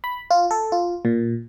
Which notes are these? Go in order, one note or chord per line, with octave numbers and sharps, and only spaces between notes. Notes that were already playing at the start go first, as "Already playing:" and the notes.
B5
F4
A4
F4
A#2